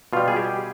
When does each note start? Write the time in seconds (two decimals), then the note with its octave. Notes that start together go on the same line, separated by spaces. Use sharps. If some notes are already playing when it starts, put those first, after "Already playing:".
0.13 B2 G3 F4
0.28 G#4
0.36 G4